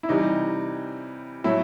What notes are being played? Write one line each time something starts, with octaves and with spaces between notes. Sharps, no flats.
E4
C3 E3 G3 D#4
A2 F#3 A3 E4